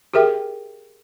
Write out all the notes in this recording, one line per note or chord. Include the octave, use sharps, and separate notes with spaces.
G4 G#4 A#4 E5 G5